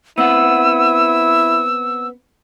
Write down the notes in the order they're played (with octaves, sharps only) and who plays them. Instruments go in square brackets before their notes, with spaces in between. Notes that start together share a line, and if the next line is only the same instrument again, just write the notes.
[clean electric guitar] B3 C4 F#5 [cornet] E4 [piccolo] E6